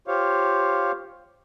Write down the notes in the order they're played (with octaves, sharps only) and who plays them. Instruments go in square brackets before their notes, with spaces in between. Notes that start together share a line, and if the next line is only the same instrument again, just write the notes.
[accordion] F4 G4 C5 C#5 F5